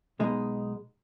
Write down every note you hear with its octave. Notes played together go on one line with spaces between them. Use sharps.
B1 B2 G#3 D#4